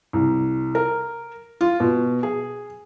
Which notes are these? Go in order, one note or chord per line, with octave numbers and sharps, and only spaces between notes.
C2
A#4
F4
B2
G#4